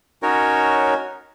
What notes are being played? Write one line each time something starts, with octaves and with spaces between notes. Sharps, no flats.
C#4 D#4 F#4 A#4 C#5